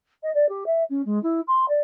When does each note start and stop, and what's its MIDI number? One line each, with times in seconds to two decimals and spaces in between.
0.23 0.30 75
0.34 0.48 74
0.49 0.64 67
0.66 0.83 76
0.89 1.02 61
1.05 1.21 56
1.23 1.40 64
1.47 1.65 84
1.68 1.81 74